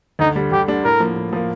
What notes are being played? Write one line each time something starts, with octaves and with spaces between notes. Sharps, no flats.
D2 D#4
D3 G3 D4
D2 G4
D3 G3 D4
A2 A#4
F3 A#3
A2
F3 A#3